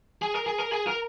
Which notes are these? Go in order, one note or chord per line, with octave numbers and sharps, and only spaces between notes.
G#4
A#4
G#4
A#4
G#4
A#4